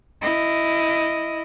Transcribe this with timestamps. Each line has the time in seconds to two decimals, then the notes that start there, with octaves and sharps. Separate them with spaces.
0.22 E4 D#5